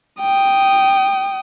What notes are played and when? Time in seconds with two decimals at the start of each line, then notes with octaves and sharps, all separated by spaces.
0.21 G5 D#6